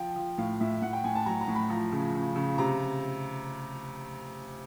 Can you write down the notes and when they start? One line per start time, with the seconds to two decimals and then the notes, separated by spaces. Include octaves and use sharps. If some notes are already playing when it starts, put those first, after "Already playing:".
Already playing: F3 G5
0.16 F3
0.38 A2 F5
0.60 A2 E5
0.82 A2 F#5
0.93 G5
1.04 A2 G#5
1.15 A5
1.26 F#3 A#5
1.41 A#5
1.48 A2
1.55 B5
1.70 F3 A#5
1.92 C#3
2.14 C#3
2.36 C#3
2.58 C3 A#5